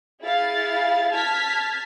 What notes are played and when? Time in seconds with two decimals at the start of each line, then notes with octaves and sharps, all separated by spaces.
0.22 E4 G#4 F5 A6
1.11 A5 F6 G#6 B6